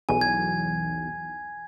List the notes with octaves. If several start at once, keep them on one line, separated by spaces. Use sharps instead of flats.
B1 E2 G#5
G#6